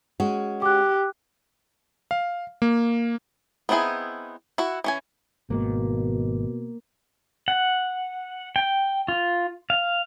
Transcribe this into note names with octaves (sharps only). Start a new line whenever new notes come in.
G#3 C#4 F#4
G4 D6 F#6
F5
A#3
B3 C4 D#4 E4 G#4
E4 F#4
E3 C#4 G#5
G#1 G#2 B2 D#3 A#3
F#5
G5
F4
F5